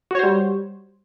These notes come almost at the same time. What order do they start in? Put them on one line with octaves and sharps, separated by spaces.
F#4 C#5 C5 G3